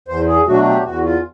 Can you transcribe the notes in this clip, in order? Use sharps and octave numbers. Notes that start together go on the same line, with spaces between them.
E2 C5
G#4
B2 F#3 A3 D4 F#4
G4
E2 F#4
F4